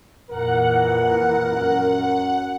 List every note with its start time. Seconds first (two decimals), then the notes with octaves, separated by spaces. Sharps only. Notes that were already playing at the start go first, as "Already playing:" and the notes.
0.30 F2 A#2 E3 A#4 F#5
1.51 F#2